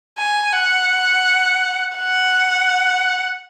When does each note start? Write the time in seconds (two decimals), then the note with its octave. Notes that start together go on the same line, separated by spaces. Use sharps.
0.18 G#5
0.53 F#5
1.97 F#5